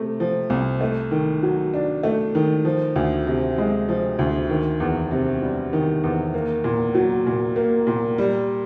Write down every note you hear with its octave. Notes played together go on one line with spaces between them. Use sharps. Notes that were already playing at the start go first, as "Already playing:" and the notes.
Already playing: C3 A3
F3
C2
A3
D#3
F#3
D4
A3
D#3
F3
D2
C3
G#3
F3
D2
D#3
E2
C3
G3
D#3
E2
A#3
A#2
F#3
A#2
A#3
A#2
G3